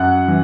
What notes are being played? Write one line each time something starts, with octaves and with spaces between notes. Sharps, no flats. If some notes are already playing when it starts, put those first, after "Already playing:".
Already playing: F#2 F#5 F#6
E3